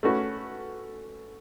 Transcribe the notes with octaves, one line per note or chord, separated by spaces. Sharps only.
A3 C#4 F#4 B4